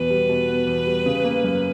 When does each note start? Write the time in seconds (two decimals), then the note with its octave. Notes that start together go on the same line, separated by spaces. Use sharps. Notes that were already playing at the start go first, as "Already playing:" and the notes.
Already playing: E2 B2 B3 B4
0.10 G3
0.29 B2
0.49 B3
0.67 E2
0.87 G3
1.06 C#3
1.24 A#3
1.44 F#2